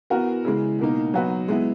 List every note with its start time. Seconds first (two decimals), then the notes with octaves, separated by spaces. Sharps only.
0.10 E3 B3 F#4 A#4
0.45 C#3 E3 G#3
0.79 B2 A#3 D#4
1.14 F#3 B3 D#4 F#4 B4
1.48 G#3 B3 E4